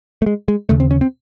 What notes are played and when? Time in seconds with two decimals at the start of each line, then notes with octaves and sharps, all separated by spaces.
0.22 A3
0.26 G#3
0.48 G#3
0.69 D#2 C#3 A3
0.80 C4
0.91 C#4
1.01 C4